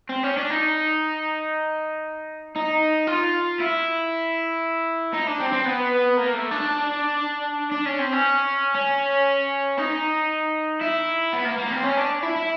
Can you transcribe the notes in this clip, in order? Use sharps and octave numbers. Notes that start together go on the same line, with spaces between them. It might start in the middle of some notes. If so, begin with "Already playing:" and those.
C4
C#4
D4
D#4
D#4
F4
E4
D#4
D4
C4
C4
B3
A#3
A3
D4
D4
C#4
C4
C#4
C#4
D#4
E4
B3
A#3
A#3
B3
C4
C#4
D4
E4
E4